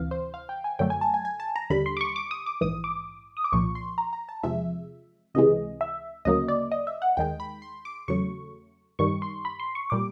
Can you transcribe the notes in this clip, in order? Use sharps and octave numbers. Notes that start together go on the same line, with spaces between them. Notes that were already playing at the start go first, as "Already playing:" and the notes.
Already playing: D2 C3 E3 F5
C5
F5
G5
G#5
F#2 D3 F#3 A3 G5
G#5
A5
G#5
G#5
A5
A#5
D#2 D3 G3 B5
C6
D6
C#6
D6
D#6
D6
A#1 G#2 E3 D#6
D6
D#6
D6
C2 A#2 F3 C#6
C6
A#5
A#5
A5
E2 C3 F3 G#3 E5
C#2 C3 E3 G#3 D#5
E5
D2 C#3 F#3 A#3 D#5
D5
D#5
E5
F#5
D#2 D#3 G#3 G5
B5
C6
D6
E2 C#3 F#3 A3 C#6
G2 D#3 G3 C#6
C6
B5
C6
C#6
A#2 G3 D6